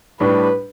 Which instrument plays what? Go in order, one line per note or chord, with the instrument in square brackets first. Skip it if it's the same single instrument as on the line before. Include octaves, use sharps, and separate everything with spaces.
[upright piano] A2 G3 D4 G4 [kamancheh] B4